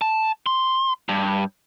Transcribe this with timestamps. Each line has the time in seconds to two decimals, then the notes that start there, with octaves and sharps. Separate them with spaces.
0.01 A5
0.46 C6
1.09 G2